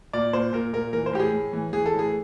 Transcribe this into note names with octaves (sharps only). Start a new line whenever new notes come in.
A#2 D5
A#2 C5
A#2 A#4
A#2 A#4
E3 A#4
C5
A2 G4
G#4
A2
E3
E3 G#4
A4
A2
G#4